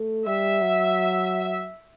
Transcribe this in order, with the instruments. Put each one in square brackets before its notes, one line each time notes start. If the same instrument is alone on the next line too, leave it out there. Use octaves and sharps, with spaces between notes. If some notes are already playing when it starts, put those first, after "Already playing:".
Already playing: [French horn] A3
[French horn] G3 [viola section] E5
[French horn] F#3